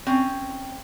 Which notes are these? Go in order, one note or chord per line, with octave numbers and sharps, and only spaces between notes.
C4 C#4